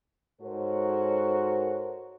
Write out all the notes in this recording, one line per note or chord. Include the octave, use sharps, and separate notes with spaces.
G#2 F#4 A4 A#4 C5 C#5